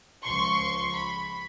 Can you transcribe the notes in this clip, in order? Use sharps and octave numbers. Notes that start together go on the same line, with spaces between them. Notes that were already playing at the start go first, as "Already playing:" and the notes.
C#2 F3 C6 C#6
B5